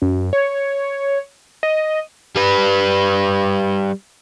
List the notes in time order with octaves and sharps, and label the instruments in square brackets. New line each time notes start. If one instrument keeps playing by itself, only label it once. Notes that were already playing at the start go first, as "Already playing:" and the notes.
[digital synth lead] F#2
C#5
D#5
[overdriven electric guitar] G3 B4